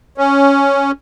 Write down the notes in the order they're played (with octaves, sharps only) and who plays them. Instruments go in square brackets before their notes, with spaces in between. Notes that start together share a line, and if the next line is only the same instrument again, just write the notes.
[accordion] C#4